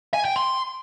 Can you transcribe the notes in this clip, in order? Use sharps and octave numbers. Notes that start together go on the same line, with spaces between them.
G#5
G5
C6